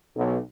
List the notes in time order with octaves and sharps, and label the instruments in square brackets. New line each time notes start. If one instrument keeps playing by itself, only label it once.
[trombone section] B1